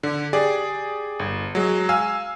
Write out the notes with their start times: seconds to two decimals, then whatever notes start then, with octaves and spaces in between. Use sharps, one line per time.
0.03 D3
0.33 G4 G#4 D5
1.19 G1
1.55 F#3 G#3
1.89 F5 G#5 E6